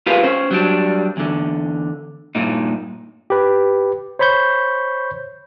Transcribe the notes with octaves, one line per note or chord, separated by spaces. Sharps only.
F4 G4 G#4 A#4 B4 F5
C#4 C5
F#3 G3 D4
E2 D3
G2 A#2 D#4
G4 B4
C5 C#5 B5 C#6 G6